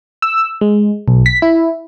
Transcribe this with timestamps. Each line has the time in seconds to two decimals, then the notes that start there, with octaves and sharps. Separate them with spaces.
0.22 E6
0.61 G#3
1.08 B1
1.26 B6
1.42 E4